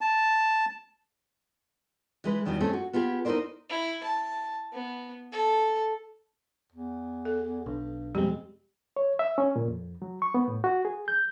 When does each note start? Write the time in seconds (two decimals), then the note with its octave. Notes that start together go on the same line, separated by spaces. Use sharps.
0.01 A5
2.24 E3 G#3 B4
2.45 E2 D#3 E3 F#3 G3
2.60 A3 C4 C#4 G#4 A4
2.73 F#4
2.93 B3 F4 G4 G#4
3.25 D#4 E4 G4 A#4 C5 D5
3.70 E4
4.04 A5
4.73 B3
5.32 A4
6.72 E2
7.25 A4
7.66 B1 G2
8.15 F2 B2 G3 G#3 C4 G4
8.97 C#5
9.19 E5
9.38 C#4
9.56 A#2
9.68 F2
10.02 F#3
10.22 C#6
10.34 B3
10.48 A2
10.64 F#4
10.85 G#4
11.08 G6